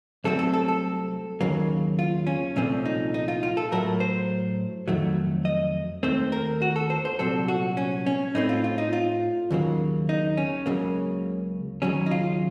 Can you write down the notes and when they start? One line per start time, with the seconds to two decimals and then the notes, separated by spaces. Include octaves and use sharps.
0.24 C2 C3 F#3 A3 C4 A4
0.39 A4
0.53 A4
0.68 A4
1.41 D#2 C#3 F#3 A#3
1.99 F4
2.27 C#4
2.56 C2 A#2 F3 A3 C4 C#4
2.85 D#4
3.14 D#4
3.28 F4
3.43 F4
3.57 A4
3.72 A2 F#3 A3 A#4
4.00 C5
4.88 F2 D#3 F#3 A3
5.45 D#5
6.03 D#2 D#3 A3 C4 C5
6.32 A#4
6.62 F#4
6.76 A4
6.90 C5
7.05 C5
7.19 C2 A#2 F#3 C4 A4
7.48 F#4
7.77 C#4
8.06 C#4
8.35 A2 A3 C4 D#4
8.49 F4
8.64 F4
8.78 D#4
8.93 F4
9.51 D#2 C#3 F#3 A#3
10.09 D#4
10.37 C#4
10.66 C#2 C#3 F#3 A#3
11.82 D#2 C#3 F#3 C#4
12.06 D#4
12.11 F4